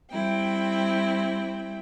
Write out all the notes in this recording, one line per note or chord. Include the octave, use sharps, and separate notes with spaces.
G3 C4 E4 G5